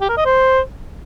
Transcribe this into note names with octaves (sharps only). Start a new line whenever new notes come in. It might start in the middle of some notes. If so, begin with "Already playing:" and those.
G4
A#4
D#5
C5